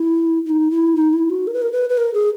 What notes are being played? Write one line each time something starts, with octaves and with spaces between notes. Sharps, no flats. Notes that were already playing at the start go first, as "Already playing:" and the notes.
Already playing: E4
E4
D#4
E4
D#4
E4
F#4
A#4
B4
A#4
B4
B4
A#4
G#4